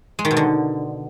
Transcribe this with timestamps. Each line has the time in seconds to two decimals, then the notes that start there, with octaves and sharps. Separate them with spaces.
0.19 G#3
0.25 D#3
0.31 B2
0.37 D3